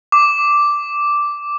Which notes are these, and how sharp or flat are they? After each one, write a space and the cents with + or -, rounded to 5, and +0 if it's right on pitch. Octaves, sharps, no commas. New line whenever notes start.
D6 -5